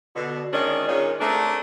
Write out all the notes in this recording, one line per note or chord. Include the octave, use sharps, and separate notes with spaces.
B2 D3
D#3 G#3 C#4 D4
A#2 D#3 G#3 A#3 C#4
A3 C4 D4 G#4 A#4